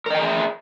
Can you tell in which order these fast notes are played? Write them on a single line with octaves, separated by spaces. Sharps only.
A#4 D#5 G5 G#4 E5